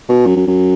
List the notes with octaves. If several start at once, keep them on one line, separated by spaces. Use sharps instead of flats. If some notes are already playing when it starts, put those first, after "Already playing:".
B2
F#2
F#2
F#2